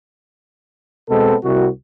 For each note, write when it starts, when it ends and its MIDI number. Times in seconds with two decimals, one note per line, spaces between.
1.10 1.35 47
1.10 1.35 56
1.10 1.35 59
1.10 1.35 60
1.10 1.35 69
1.44 1.67 36
1.44 1.67 66